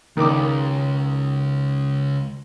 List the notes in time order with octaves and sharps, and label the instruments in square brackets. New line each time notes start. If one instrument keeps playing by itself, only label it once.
[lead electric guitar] C#2 [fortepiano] D#3 D6